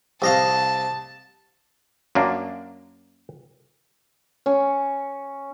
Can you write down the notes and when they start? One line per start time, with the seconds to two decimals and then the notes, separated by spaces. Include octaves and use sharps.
0.22 C2 D#5 F5 A5
2.15 F#2 A#3 D4
4.46 C#4